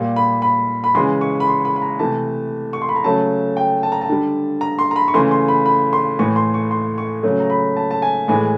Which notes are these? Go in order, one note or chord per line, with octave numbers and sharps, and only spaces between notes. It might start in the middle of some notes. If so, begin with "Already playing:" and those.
Already playing: A#2 G3
B5
B5
B5
C#3 E3 G#3 C6
C#6
B5
C6
B5
B5
A#5
C3 E3 A3 A5
C#6
C6
B5
A#5
C#3 F#3 A3 A5
G5
A5
A#5
A5
D3 G3
A#5
C6
A#5
B5
C#6
C#3 E3 A3 C6
C6
B5
B5
C6
A2 E3 A3 C#6
C6
C#6
C6
C#6
C#3 F#3 A3
A#5
B5
A5
A5
G#5
A2 E3 G#3 G#5